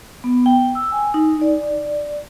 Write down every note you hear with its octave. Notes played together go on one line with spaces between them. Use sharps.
B3
G5
E6
G#5
D#4
D5